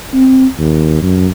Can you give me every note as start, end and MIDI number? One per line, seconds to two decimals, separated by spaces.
0.14 0.46 60
0.59 0.98 39
1.02 1.29 42